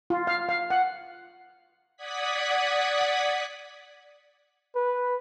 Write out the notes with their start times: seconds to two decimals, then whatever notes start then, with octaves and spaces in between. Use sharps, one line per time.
0.10 F4
0.27 F5
0.49 F5
0.70 F#5
1.97 D5 F#5 D#6 F#6 G#6 B6
4.75 B4